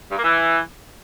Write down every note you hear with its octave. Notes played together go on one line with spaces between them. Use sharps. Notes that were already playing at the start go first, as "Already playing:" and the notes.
G2
A#3
E3